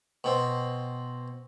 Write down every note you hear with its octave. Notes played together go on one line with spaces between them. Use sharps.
B2 C4